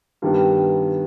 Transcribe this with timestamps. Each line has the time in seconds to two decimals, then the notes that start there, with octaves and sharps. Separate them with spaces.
0.22 G2 D#3 G3 B3